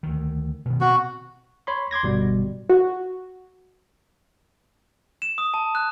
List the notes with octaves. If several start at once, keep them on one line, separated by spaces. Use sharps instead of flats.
D2 D#3
B2 D#3
B2 C4 F#4
C#5 B5 C6
C6 D6 G#6 A#6
G1 B2 G3
F#4
E7
D#6
A5
F#6